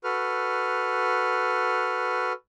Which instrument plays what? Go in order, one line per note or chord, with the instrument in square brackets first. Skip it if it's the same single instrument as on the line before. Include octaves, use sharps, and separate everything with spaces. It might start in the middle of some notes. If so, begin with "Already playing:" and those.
[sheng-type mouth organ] F#4 A4 B4 F6